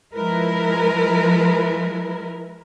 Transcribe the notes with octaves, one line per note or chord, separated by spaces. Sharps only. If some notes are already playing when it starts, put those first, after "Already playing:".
F3 G#3 E4 A#4 B4